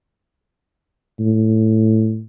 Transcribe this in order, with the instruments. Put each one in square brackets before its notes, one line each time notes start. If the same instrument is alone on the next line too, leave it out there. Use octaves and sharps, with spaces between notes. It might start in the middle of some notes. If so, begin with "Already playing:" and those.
[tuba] A2